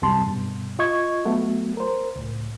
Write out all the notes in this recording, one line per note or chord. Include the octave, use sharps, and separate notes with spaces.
C2 F#2 C3 G3 A5 C6
G2 B2
F4 D#5 C#6 G#6
F#3 A3 B3 F#4
A#4 C5
C#2 A2